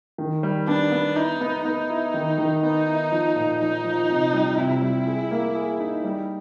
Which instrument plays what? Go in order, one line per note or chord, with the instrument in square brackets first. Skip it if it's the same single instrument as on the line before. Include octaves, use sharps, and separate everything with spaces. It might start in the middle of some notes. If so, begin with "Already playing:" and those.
[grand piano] D#3
G3
[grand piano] B3 [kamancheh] D4
[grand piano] B3
[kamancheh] D#4 [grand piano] E4
[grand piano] B3
[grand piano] B3 [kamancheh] D#4
[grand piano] E4
D#3
D#3
[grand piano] B3 [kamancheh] D#4
[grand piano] E4
F3
A#2
[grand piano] F3 [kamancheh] D#4
[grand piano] F3
C3
G3
[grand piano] C3 [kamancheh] E4
[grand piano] G3
G#4
A#3
G#4
D#4
G3